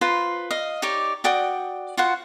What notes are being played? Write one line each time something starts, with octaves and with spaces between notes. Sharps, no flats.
F4 B4 C5 A#5
D#5 F5
D#4 G4 C#5 D5
F#4 D5 G5 D#6
F4 F#4 C5 F#5